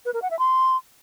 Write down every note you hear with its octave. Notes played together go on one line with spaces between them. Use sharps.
B4
A#4
F#5
E5
C6